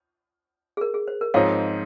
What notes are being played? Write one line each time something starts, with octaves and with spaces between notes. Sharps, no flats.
G#4
A#4
G#4
C5
A#4
G#2 F3 C4 D#4 C#5 F5